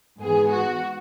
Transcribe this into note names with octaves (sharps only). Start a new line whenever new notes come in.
G#2 E3 B3 G#4
F#4